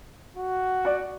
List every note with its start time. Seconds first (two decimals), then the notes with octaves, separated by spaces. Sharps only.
0.37 F#4
0.85 D5 F#5